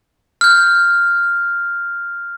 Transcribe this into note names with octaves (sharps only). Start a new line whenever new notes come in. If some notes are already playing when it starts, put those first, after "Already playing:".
F6 G6